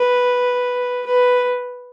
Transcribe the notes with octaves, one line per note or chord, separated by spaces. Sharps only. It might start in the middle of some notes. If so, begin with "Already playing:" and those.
Already playing: B4
B4